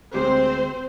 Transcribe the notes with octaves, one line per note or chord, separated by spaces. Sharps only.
D2 G#3 C4 G4 C5